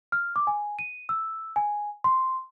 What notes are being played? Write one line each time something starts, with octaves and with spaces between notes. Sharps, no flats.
F6
D6
G#5
D#7
E6
G#5
C6